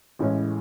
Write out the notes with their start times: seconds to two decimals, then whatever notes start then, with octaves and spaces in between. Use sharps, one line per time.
0.19 A1 A2 E3 G#3 C#4